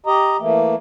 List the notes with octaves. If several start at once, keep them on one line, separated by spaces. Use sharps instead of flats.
G4 D#5 A#5
E3 A3 A#3